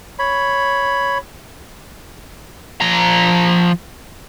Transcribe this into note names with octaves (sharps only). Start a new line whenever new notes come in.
C#5 B5
F3 A#5